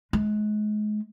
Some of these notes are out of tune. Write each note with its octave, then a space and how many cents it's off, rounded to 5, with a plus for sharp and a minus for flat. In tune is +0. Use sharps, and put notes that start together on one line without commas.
G#3 +30 F4 -10